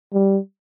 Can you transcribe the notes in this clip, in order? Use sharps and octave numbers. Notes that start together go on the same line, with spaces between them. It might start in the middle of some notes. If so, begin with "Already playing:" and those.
G3